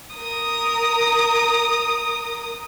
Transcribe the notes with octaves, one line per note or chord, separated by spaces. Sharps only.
A#4 D#6